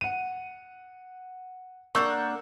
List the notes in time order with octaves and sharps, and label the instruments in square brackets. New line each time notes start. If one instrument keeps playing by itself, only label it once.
[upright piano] F#5 D#7
[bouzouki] A#3 D4 F#5 [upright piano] C#6 E6 G6